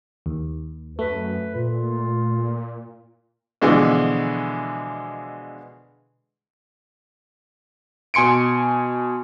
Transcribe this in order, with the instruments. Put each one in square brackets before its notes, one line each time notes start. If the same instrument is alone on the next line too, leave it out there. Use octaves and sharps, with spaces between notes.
[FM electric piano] D#2
[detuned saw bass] F#2 [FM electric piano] A3 [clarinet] B4
[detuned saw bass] A#2 [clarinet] F4
[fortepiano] B2 D3 E3 F3 G#3
[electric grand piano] B2 G#5 C6 C#7 D7